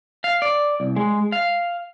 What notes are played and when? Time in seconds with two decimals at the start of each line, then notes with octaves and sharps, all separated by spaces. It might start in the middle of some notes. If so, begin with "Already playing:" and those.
0.24 F5
0.42 D5
0.80 C2
0.96 G#3
1.32 F5